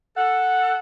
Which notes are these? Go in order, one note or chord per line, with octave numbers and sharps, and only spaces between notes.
A4 F#5